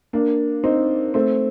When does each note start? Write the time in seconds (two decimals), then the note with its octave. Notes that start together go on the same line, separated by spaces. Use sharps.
0.13 A#3 D4
0.64 C4 D#4
1.14 A3 C4